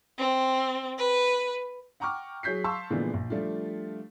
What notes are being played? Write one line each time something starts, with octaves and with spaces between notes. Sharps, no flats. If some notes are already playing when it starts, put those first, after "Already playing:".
C4
B4
F#5 G5 A#5 C#6 D6 F6
F#3 G#4 C#5 G6 B6 C7
F5 A5 C6 C#6 E6
A#2 D3 E3 F3 G#3 B3
A#1
F3 G3 A3 D4 F4